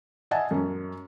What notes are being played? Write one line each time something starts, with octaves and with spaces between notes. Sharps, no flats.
D#5 E5 F#5 G#5 A5
F#2 C#4